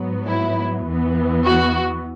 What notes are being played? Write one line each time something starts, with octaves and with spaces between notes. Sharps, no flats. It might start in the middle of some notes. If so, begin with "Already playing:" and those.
Already playing: G#2 F#3 B3
E4
E2 E3 B3
F#4